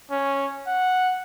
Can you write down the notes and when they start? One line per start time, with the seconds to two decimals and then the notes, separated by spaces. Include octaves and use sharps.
0.11 C#4
0.67 F#5